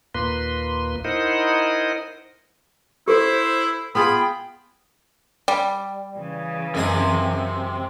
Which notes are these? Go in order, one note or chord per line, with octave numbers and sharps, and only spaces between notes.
D#2 A#2 A#3 B4 C6
D#4 E4 A#4 C5 D#5 F#5
E4 G4 A4 C5
B3 F4 G#4 G5 B5
G3
C#3 E3
F#2 C3 G#3 D#6